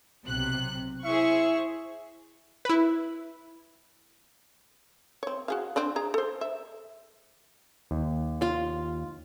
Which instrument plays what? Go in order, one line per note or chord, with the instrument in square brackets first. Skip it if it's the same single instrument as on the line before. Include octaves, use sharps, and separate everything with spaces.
[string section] B1 C3 F#6
[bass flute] E4 [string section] G#4 C5 C#6 [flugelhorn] E5
[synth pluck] E4 B4
[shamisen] C4 C#5
F#4 G#4 F5
C4 D4 D5
G#4 A#5
A4 C5
E5
[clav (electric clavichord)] D#2
[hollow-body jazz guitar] F4